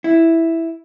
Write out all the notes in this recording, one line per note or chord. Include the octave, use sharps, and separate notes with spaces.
E4